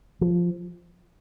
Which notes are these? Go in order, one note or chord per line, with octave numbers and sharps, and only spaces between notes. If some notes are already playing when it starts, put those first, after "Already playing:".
F3